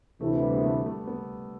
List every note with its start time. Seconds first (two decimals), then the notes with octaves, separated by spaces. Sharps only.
0.20 D2 C3 E3 A3
0.42 G3
0.57 B3
0.64 A3
0.86 A3
1.07 B3